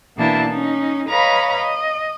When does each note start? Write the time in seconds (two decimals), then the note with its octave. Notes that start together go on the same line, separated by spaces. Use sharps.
0.17 B2 E3 A#3 D4 E4 A5
0.49 C#4 D#4
1.08 B4 C#5 D#5 F5 A#5 B5
1.56 D#5